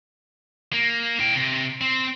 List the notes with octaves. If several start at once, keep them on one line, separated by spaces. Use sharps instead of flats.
A#3
E4 G5
C3
C4